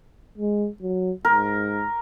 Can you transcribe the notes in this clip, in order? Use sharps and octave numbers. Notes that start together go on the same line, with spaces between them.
G#3
F#3
G#2 A#4